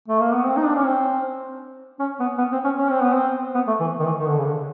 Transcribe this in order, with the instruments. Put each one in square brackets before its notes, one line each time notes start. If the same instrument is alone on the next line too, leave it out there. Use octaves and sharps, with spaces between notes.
[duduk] A3
A#3
B3
C4
D#4
D4
C#4
C4
C#4
B3
B3
C4
C#4
C#4
C4
B3
C4
B3
A3
E3
D#3
E3
D#3
D3
C#3
D3